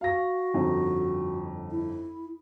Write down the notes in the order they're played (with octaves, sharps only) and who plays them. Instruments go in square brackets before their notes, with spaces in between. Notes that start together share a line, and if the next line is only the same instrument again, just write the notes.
[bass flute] F#4 [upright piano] F5 A#6
[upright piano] G1 F2 D#4
[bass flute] E4